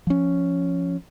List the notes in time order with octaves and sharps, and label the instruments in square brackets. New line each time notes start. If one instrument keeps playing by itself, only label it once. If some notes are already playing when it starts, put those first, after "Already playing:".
[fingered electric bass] F3 C#4